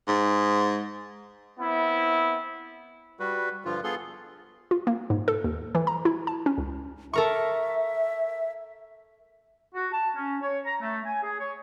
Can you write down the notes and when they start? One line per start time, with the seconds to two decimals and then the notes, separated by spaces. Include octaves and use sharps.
0.08 G#2
1.59 B3 C4 E4
3.20 G3 F#4 B4
3.65 G2 D3 F3 F4
3.84 B3 F4 G#4 A4 C6
4.71 F4
4.87 A#3
5.10 G#2
5.28 A4
5.44 D#2
5.75 E3
5.87 A#5
6.05 E4
6.27 A5
6.46 C#4
6.58 C#2
7.13 A4 A#4 E5 C#6
9.75 F#4
9.93 A5
10.16 C#4
10.42 C#5
10.66 A#5
10.81 A3
11.05 G#5
11.23 G#4
11.40 C#5